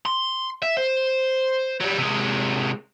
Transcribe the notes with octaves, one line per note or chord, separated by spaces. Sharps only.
C6
E5
C5
F#3 G3
C3 G#3